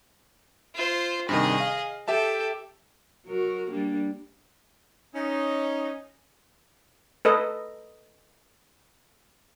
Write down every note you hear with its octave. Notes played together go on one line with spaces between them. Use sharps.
F4 C5
G2 C3 D#3 G#4 D#5
F5
G4 A4 E5 G5 A5
F#3 F#4 A#4
G3 A#3 D4
C#4 D#4
A4 B4 D#5